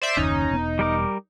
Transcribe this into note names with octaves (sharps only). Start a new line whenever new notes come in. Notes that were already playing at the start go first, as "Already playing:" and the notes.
C5 D5 E5
F#1 D#2 C#4 D#4
E1 B3
G3 A#4 D6